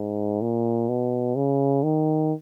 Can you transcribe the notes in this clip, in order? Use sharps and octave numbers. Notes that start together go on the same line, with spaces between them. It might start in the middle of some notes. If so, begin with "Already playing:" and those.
Already playing: G#2
A#2
B2
C#3
D#3